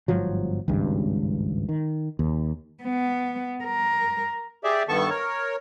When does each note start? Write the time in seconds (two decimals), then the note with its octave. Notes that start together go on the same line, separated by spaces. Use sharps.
0.08 G1 G#2 F3 F#3
0.68 G#1 C#2 G2
1.69 D#3
2.19 D#2
2.83 B3
3.64 A#4
4.64 G4 G#4 D5 E5
4.89 G2 D#3 B3 A4 A5 C#6
5.10 A#4 C#5